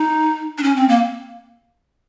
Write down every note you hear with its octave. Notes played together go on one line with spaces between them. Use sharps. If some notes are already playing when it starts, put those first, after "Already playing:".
Already playing: D#4
D4
C#4
C4
A#3